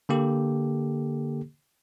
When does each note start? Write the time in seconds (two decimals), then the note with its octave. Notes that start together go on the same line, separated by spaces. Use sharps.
0.09 D3 A#3 G4 A4